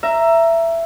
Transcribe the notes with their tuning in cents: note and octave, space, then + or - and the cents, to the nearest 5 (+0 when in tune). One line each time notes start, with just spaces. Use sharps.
E5 +15 A#5 +0